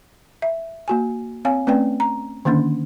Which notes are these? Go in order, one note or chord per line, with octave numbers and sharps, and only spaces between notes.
E5
A#3 F#4 G#5
C4 C#5 F5 G#5
A3 C4 C#4 B4 D5 G5
A#5
D3 D#3 A#3 C#4 D4